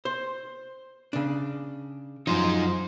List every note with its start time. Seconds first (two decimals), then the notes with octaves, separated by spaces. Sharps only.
0.05 C5
1.13 C#3 D4
2.27 F#2 F3 D#4 C5